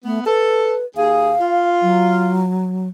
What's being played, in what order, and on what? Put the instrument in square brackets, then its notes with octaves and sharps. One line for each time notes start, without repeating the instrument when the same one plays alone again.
[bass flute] A3 [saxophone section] B3
[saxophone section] A4 [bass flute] B4
[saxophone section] D#2 G#4 [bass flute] F5
[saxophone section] F4
[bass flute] F#3